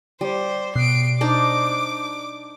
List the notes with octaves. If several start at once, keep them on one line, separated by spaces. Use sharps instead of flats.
G3 C5
B2 C7 D7
D4 D#4 C5 D6